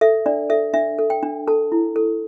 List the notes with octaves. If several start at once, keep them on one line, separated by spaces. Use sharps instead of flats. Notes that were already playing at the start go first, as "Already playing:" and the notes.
A4 E5
D4 D5
A4 E5
D4 E5
A4
G5
D4
A4 A5
E4
A4